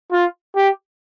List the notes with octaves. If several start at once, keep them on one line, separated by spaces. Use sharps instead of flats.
F4
G4